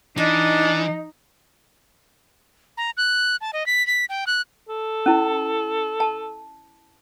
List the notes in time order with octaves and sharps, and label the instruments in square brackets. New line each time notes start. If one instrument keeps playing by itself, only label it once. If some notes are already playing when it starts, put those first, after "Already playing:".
[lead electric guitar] E3 [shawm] D4 [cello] D#4 [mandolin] D#5
[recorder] A#5
F#6
A5
D#5
B6
B6
G5
F#6
[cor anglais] A4
[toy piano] C#4 E4
A5